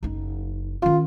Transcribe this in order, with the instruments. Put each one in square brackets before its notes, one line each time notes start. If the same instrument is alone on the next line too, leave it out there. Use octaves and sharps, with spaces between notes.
[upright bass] F#1 D#4
[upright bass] D#3 C#4 [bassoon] F4